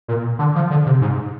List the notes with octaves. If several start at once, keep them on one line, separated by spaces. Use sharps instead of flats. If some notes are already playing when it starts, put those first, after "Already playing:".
A#2
D3
F3
D3
C3
G#2